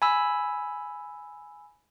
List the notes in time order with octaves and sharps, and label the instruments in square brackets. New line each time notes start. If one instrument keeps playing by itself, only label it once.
[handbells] G#5 B5 E6